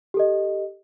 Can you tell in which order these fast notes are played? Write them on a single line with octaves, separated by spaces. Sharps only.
G4 A4 D#5